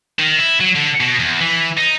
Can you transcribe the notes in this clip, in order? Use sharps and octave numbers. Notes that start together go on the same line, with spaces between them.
D#3
E4
F#3
D3
B2
E2
E3
D#4